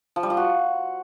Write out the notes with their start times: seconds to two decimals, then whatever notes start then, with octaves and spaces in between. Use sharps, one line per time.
0.16 F3
0.23 G3
0.30 F3
0.37 F#4